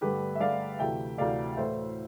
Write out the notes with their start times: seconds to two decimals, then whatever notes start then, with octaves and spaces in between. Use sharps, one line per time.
0.01 G2 D3 A3 G4 B4
0.35 E5
0.40 G2 D3 A3 D5 F5
0.79 D2 C3 E3 A3 E5 G5
1.18 D2 C3 E3 A3 D5 F5
1.57 A2 E3 A3 C5 E5